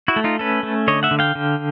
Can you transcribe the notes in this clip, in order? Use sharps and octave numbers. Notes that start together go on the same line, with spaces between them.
E4 F#4
A3
D#4 F4
C#4 A4 B4
A3
D3 C#5 D#5
E5 F#5
D3
F5 G5
D3